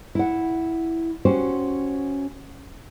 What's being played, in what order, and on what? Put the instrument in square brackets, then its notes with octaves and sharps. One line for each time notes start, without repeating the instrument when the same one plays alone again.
[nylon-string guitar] E4 F#5
C#4 F#4 G4 C5